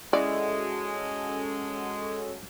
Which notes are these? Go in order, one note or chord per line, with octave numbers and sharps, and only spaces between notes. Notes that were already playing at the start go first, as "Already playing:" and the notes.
G#3 C#4 E4 F#4 A4 D5 D#5